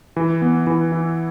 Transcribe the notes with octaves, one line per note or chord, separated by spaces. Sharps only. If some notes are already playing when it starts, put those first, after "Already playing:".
E3
B3
E3
E4